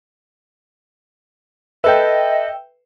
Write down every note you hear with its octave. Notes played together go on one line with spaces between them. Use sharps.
A4 B4 D#5 E5 G5